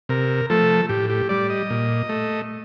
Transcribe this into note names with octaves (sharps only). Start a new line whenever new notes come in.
C3 A#4
F3 A3 A4
A2 G4
G4
G3 D5
D#5
A#2
A3